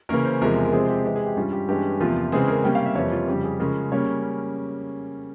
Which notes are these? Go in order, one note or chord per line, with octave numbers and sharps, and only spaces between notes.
C#3 E3 A#3 C#4 A#4
C5
E2 C3 F3 G#3 A#4
A#4
C3 F3 G#3 C4 G#4
G4
C3 E3 G#3
G#4
G4
G2 G3 C#4 F4
G4
G2 E3 G#3 C#4 G4
E2 C3 F3 A#3 F4
C#3 E3 G#3 C4 G#4
A#4
C3 G3 A#3 C#4 G5
F5
E5
F2 C3 E3 G3 A#3 C#5
F4
F2 C#3 G3 G4
G#4
C#3 F3 G#3 C#4 A#4
C#3 G3 A#3 C#4 C#5